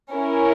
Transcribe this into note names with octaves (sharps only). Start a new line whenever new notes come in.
C#4 E4 A#4